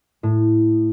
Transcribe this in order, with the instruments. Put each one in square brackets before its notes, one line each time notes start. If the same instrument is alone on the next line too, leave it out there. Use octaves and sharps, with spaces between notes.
[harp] A2